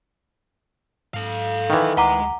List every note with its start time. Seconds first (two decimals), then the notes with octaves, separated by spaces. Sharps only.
1.14 G#2 A4 F5
1.70 D#3 E3
1.97 D2 G#3 F#5 A#5 D6